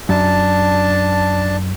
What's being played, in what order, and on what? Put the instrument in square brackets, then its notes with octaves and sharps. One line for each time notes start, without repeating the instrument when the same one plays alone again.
[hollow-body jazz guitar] F#2 [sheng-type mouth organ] D4 A5